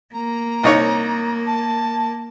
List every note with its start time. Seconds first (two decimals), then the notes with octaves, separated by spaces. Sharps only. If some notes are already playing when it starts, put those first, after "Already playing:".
0.14 A#3 A#5
0.63 C2 D#4 C#5
1.46 A5